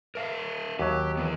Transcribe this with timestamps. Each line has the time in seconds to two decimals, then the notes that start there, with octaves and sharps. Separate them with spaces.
0.15 A#4 E5 F5
0.79 D#2 F#3 G4
1.17 E3 B3